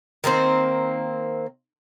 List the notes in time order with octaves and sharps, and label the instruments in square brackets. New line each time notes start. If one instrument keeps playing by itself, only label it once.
[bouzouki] D#3 A#3 C4 C5